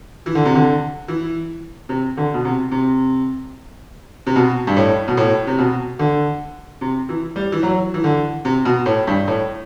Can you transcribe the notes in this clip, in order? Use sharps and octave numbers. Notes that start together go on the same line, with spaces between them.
E3
D3
C3
D3
E3
C3
D3
B2
C3
C3
C3
B2
G2
A2
B2
A2
C3
B2
D3
C3
E3
G3
E3
F#3
E3
D3
C3
B2
A2
G2
A2